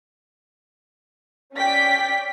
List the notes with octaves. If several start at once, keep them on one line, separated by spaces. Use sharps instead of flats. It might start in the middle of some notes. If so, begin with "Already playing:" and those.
C#4 D5 G5 B6